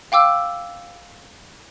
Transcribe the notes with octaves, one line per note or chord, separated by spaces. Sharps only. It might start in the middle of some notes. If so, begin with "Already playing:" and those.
F5 G5 D6 E6